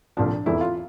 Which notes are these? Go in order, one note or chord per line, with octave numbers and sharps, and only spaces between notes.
C2 A#2 F3 D4
F1 E2 E3 E4
F4